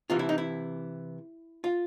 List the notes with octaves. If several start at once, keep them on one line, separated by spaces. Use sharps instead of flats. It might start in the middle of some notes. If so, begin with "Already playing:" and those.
C3 E3 F4
E4
D#4
E4
F4